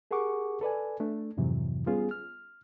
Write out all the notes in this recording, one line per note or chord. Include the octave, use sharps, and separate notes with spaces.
G4 G#4 A#4 F#5 C#6 D6
A4 B4 D5 G#5
A3 D4
F2 G#2 C3 E3 F#3
G3 B3 C#4 F4 G#4
F6